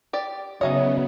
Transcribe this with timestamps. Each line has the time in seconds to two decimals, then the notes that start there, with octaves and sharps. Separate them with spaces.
0.13 G4 D5
0.61 C#3 F#3 B3 D#4 G#4 C#5 D#5 E5